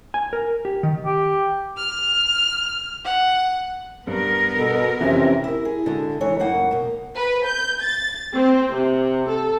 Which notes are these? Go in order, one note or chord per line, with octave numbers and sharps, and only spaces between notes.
G#5
A#4
G4
D#3
G4
F6
F#5
G2 B3 A#4
B2 A4
F2 C3 E3 C#4 E5
E4 A#4
G#4
D3 G#3 F#4 E5
E3 G#3 C#5
F#2 C#3 A#3 D#4 F#5
B2 A#3
B4
G6
A6
C4
C3
A4